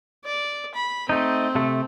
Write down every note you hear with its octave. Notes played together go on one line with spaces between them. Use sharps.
D5
B5
A3 C4 D#4
C3 A3